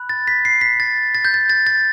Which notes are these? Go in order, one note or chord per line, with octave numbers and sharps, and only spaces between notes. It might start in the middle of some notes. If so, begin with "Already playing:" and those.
Already playing: B5 F#6
A6
B6
C7
B6
A6
A6
G6
A6
A6
A6